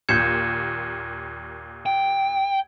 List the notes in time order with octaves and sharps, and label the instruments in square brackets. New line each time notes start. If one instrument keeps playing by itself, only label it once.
[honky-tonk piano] D#2 A#2 G6 [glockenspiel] G#6 C#7 E7
[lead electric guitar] G5